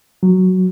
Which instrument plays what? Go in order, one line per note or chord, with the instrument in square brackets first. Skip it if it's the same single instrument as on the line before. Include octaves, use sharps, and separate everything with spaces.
[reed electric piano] F#3